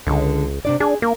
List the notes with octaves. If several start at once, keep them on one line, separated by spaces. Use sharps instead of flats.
C#2 D3 G#3
C3 D4 D5
D4 G#4
A#3 A#4